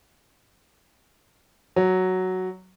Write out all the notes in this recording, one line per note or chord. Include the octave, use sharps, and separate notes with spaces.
F#3